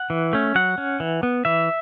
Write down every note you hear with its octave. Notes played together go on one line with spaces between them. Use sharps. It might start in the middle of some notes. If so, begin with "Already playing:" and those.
Already playing: F#5
E3
A3 C#4
F#3 F#5
C#4
E3
B3
E3 E5